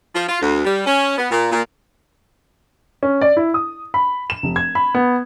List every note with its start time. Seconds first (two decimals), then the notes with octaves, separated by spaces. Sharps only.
0.15 F3
0.28 F4
0.42 D2
0.65 G3
0.86 C#4
1.18 B3
1.31 A#2
1.52 A#2
3.03 C#4
3.21 D5
3.37 E4
3.54 D#6
3.94 B5
4.30 E7
4.43 F1
4.56 G#6
4.75 B5
4.95 B3